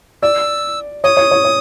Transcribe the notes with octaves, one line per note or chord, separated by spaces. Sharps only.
D5 E6
C#5 D#6
C#5
C#5
C#5